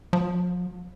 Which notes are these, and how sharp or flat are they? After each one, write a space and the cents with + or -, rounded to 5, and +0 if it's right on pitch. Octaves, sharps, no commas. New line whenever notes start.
F3 +40